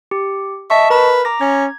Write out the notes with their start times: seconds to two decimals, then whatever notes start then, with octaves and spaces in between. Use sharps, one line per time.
0.11 G4
0.70 D#5 E5 A5 C#6
0.90 A#4 B4
1.25 A#5 D6 A#6
1.41 C#4 G#6